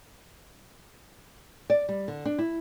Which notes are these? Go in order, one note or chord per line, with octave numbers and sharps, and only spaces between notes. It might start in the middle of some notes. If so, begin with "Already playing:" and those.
D5
G3
D3
D4
E4